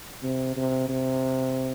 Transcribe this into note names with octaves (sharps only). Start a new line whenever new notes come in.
C3
C3
C3